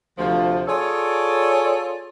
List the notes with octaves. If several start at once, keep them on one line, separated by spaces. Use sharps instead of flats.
D2 C3 F3
F4 G#4 A4 C#5 D5